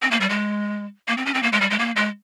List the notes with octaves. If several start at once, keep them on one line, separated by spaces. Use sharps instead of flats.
C4
A#3
G3
G#3
A#3
C4
C#4
C4
A#3
G#3
G3
G#3
A#3
G#3